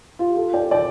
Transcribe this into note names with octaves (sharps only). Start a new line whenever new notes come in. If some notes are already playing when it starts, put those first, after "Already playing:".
F4
G4
F4 A4
D5 G5
D5 G5